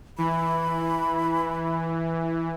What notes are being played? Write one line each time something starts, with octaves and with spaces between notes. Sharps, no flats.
E3 B5